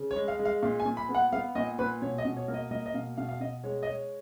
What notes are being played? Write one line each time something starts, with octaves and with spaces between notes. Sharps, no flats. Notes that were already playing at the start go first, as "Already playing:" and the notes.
Already playing: C#3
C#5
G#3
F5
G#3
F5
A#2 F5
G#5
A#2
B5
B3
F#5
B3 F5
A#2 D#5
A#2 B4
B2 C#5
D#5
B2
C#5
A#3
D#5
A#3 D#5
D#5
B2 F5
B2 F5
F5
B2 D#5
G#3 C#5
D#5
G#3 C#5